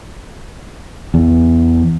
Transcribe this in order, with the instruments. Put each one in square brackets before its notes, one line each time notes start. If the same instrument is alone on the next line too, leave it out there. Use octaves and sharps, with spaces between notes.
[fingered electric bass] E2